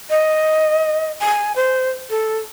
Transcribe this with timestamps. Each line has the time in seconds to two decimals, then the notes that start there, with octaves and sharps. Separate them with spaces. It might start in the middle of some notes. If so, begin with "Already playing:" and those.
0.10 D#5
1.21 G#5
1.56 C5
2.10 A4